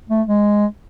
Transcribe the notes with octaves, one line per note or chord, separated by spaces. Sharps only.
A3
G#3